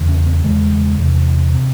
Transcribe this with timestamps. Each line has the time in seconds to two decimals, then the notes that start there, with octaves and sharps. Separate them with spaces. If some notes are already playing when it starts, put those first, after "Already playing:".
Already playing: E2 C#3
0.09 C#4
0.26 C4
0.44 E2 C#3 G#3
0.99 E2 C3
1.54 C3